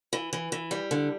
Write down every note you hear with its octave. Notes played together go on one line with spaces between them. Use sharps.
E3
E3
E3
G3
D3